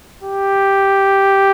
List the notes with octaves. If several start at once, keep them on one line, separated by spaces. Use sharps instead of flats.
G4